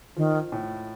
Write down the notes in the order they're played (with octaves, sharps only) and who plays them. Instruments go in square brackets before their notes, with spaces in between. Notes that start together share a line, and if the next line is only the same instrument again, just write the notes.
[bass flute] D#3 [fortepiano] F3
[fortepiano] A2